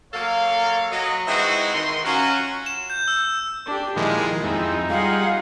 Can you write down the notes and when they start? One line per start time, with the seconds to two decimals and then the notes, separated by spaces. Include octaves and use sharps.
0.14 F#3 A#3 A4 C#5 F5
0.92 F#3 D#5
1.28 E3 G#3 C4 D#4 E4 F#4
1.74 D#3 C6
2.05 F#3 C#4 F4 F#4
2.66 E7
2.90 G6
3.08 E6
3.66 D4 G4
3.97 A#2 D#3 F3 G#3 E4
4.43 F2 G#3 C4 D#4 E4
4.90 G3 F4 G#4 F5 F#5